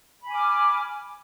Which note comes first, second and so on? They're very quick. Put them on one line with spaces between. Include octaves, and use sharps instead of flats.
B5 G#5 D6 F6